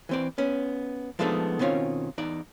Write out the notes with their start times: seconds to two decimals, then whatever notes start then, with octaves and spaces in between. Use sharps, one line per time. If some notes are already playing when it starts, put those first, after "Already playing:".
0.09 E3 C4 D5
0.38 B3 C#4
1.19 F3 G#3 A3 B3 D4 D#4
1.59 B2 D#3 C4 C#4 F4
2.18 E2 D#4 D5